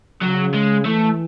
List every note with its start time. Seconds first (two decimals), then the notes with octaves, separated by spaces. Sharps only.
0.22 C#3 F#3
0.54 G#3
0.85 E3 A3